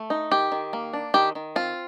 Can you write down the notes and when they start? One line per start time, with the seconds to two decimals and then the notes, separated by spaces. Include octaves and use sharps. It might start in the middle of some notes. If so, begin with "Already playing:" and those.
Already playing: A3
0.10 D#4
0.31 D#3 G4
0.52 D#3
0.73 A#3
0.94 D4
1.14 D#3 G4
1.35 D#3
1.56 C4 F4